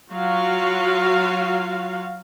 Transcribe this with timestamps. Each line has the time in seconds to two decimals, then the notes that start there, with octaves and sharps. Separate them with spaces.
0.11 F#3 F4 F#4 F5